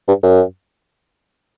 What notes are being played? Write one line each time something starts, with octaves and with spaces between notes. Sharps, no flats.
G2
F#2